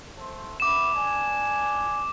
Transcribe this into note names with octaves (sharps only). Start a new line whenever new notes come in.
A3 C5
B3 E5 B5 D6 E7
D4 G#5